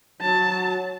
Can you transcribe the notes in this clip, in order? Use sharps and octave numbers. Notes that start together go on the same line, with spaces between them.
F#3 A5